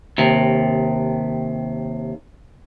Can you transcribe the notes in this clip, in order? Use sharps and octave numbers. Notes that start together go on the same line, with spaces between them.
D#2 C3